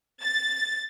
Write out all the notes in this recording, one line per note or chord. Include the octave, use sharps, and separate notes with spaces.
A6